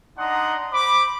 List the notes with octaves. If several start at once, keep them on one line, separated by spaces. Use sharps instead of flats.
D4 D#4 F#5 A#5 C6 D#6
C5 B5 D6